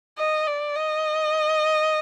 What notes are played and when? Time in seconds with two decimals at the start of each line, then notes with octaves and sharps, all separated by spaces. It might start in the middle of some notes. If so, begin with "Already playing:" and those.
0.18 D#5
0.47 D5
0.75 D#5